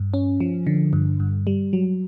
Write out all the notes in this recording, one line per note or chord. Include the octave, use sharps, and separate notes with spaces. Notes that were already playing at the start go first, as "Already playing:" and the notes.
Already playing: G2
C#4
F3
D3
G2
G2
G3
F#3